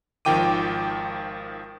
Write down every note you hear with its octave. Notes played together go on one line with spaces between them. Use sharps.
G#1 D#3 F3 G5 D6 D#7